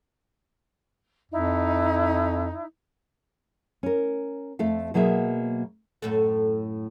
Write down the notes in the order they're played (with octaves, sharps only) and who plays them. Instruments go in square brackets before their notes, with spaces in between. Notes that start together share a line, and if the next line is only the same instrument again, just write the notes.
[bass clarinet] F2 [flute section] D#4 E4
[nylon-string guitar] C#4 A#4
F2 A3 A4 F5
B2 F#3 A#3 G#4 D#5 E5
[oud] F#2 A2 A4